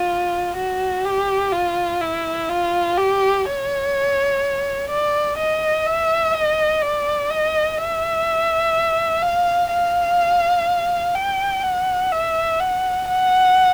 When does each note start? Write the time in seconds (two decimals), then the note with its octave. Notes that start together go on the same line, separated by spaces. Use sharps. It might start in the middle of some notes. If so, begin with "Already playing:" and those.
Already playing: F4
0.57 F#4
1.05 G4
1.53 F4
2.01 E4
2.49 F4
2.97 G4
3.45 C#5
4.90 D5
5.38 D#5
5.86 E5
6.34 D#5
6.82 D5
7.30 D#5
7.79 E5
9.22 F5
9.71 F5
11.15 G5
11.63 F#5
12.12 E5
12.60 F#5
13.08 F#5